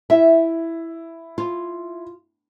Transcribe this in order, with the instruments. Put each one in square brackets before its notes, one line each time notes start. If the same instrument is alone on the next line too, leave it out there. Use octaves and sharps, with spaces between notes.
[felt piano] E4 [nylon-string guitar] E5
[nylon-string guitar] F4